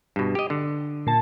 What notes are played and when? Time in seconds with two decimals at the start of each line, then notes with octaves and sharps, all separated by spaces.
0.16 G2 B2
0.35 G4 D#5
0.50 D3
1.07 A#2 A5